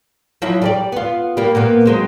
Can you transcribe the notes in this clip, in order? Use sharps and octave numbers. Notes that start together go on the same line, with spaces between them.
F3 F#3 E4
G3 G#4 D5
B3 F4
G3 A#3
A#2 A#3 B3
F#3 G#3 C4